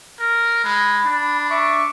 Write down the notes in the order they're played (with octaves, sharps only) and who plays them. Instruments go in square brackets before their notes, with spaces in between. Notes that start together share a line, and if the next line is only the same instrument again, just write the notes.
[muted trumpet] A#4
[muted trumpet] G#3 [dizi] B5
[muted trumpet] D4
[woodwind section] E5 C#6 D6